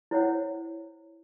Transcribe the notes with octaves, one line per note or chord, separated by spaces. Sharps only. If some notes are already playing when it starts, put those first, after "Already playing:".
E4 C5 C#5 F#5